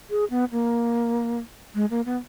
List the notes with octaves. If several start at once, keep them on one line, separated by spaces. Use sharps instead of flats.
G#4
B3
A#3
G#3
A#3
B3